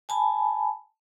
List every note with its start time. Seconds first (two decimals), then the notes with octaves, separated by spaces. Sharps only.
0.09 G#5 A5 B5